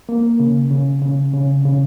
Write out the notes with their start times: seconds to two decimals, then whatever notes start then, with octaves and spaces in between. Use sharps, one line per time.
0.09 A#3
0.40 C#3
0.71 C#3
1.02 C#3
1.33 C#3
1.65 C#3